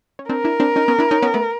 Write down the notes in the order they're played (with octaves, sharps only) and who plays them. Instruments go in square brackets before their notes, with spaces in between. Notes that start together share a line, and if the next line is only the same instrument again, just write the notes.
[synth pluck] C#4
[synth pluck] C4 D4 [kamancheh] A#4
[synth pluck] D4 E4
C4 D4
C#4 D#4
B3 C#4
D4 E4
C#4 D#4
B3 C#4
A3 B3